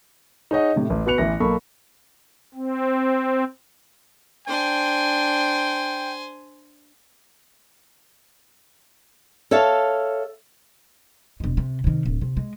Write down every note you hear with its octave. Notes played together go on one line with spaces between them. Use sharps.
D#4 G#4 C#5 D#5 F#5
A2 C3
A1
B3 F#4 B4 F#6 C#7 F7
A1 E3 A#6
B1 A#3 A4 B5 C#6
C4
D4 C5 G5 G#5
A4 C#5 E5 F5 A5
E1 G#3
C3
C3 D#3
D1
C3
G#3